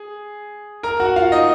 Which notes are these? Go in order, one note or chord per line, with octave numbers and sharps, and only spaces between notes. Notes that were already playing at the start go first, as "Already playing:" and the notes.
Already playing: G#4
A#4 A#5
F#4 F#5
F4 F5
D#4 D#5